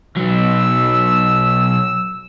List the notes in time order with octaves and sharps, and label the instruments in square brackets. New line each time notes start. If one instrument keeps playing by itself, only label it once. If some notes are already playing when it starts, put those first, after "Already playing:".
[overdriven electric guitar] B2 F#3 [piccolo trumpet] E6